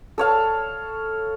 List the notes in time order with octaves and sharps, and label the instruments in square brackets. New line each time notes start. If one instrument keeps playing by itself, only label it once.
[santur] A4 C#5 F5